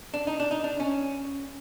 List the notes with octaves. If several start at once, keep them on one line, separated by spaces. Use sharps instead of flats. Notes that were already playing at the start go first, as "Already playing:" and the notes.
D4
D#4
D4
D#4
D4
C#4